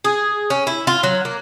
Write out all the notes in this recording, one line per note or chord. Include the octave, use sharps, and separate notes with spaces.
G#4
C#4
E4
F4
F#3
A#3